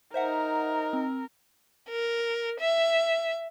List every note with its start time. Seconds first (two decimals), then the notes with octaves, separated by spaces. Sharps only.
0.14 D#4 A#4 C5 E5 F#5
0.93 C4
1.89 A#4
2.60 E5